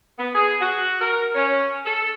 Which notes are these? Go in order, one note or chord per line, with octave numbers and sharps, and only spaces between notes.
B3
G#4
F#4
A#4
C#4
A4